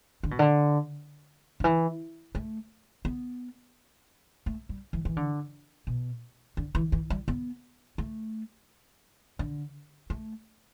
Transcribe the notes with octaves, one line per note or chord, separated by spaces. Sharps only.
D3
B2
D3
D3
E3
A3
B3
A3
G3
E3
E3
D3
B2
D3
E3
E3
G3
B3
A3
D3
A3